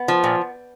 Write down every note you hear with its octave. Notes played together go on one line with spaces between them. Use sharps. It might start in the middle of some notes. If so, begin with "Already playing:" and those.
Already playing: B3
F3
A#2